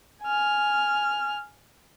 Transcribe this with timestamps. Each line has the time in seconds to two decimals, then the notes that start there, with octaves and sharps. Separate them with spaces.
0.23 G#5 F6